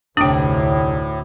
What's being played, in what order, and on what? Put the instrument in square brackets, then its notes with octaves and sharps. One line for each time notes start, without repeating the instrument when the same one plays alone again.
[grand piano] F1 D6 D#6 [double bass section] D2 [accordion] A2 [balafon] D4 G5